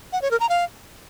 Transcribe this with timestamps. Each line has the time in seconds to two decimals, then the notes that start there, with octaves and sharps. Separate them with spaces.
0.13 F#5
0.22 C#5
0.31 A#4
0.40 A#5
0.49 F5